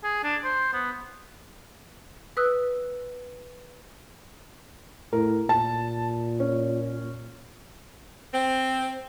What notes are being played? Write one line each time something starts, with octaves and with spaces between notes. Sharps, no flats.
G#4
D4
C5
B3
B4 D#6 E6 F#6
A2 A#4
A#2 A5
C#4
C4